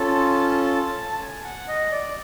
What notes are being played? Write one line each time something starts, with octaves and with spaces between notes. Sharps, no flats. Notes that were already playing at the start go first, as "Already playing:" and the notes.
Already playing: C#4 F4 A4 A5
A5
G#5
F#5
D#5
D5